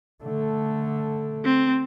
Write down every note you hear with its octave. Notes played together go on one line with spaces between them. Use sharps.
D3 A3
C4